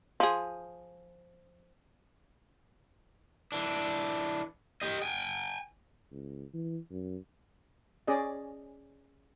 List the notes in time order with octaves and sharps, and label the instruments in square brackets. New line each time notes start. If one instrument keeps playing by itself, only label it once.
[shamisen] F3 G#4
[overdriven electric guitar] E3 D4
G4 D#5
G5 G#5
[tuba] C#2
E3
F#2
[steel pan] C#4 G#4 D5 D#5